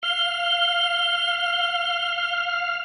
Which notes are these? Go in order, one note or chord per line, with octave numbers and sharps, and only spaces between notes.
F5 F6 G7